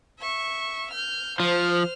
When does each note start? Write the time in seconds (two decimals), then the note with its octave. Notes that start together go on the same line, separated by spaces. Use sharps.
0.20 E5 C#6
0.92 F6 G6
1.40 F3 C5 F6